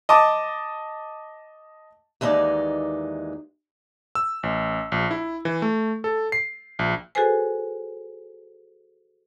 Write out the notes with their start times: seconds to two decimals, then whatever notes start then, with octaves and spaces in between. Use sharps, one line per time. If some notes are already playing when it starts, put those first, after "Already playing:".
0.09 D#5 A5 D6
2.21 D#2 E3 G#3 C#4 D#4 D5
4.15 E6
4.43 A1
4.92 A#1
5.11 E4
5.45 E3
5.62 A3
6.04 A4
6.32 C7
6.79 A#1
7.15 F#4 G#4 A4 B4 C5 G#5